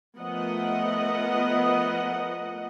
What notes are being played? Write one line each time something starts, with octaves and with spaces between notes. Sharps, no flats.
F3 A3 B3 A#4 D#5 F#5